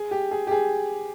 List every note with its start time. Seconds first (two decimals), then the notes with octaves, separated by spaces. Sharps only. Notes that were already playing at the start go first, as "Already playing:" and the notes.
Already playing: G#4
0.11 G4
0.31 G#4
0.47 G4
0.51 G#4